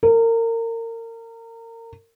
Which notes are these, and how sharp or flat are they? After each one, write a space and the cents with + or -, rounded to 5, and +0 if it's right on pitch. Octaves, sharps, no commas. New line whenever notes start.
A#4 -30